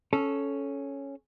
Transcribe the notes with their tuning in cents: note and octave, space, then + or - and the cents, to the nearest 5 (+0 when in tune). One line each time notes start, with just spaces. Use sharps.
C#4 +0 A4 -15